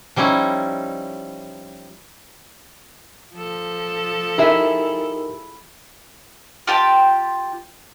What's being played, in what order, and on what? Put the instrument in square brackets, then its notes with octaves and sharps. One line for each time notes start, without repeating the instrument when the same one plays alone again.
[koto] F3 G3 C#4 D#4 E4
[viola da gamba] F3 A4
[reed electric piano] D#4 G4 A#4 [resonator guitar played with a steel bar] E4 G#4 E5
[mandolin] F4 G4 G5 A5